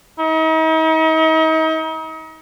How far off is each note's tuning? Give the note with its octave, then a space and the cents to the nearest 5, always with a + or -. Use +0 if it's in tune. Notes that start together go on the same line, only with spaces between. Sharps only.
D#4 +40